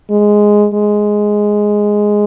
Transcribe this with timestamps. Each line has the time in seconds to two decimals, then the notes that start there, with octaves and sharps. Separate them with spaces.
0.10 G#3
0.74 G#3